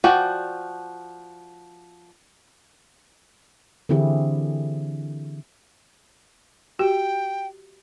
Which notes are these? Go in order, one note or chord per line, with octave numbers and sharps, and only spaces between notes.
F3 F#4 D5 G5 G#5
D3 E3 C4 E4 G4 G#4
F#4 G4 G5